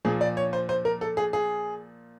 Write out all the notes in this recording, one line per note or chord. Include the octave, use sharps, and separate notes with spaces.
A#2 F3 G#4
D5
C#5
C5
C5
A#4
A4
G#4
G#4